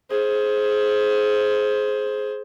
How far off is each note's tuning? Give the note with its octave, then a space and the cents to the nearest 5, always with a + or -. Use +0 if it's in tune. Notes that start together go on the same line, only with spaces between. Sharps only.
G#4 +20 C5 +10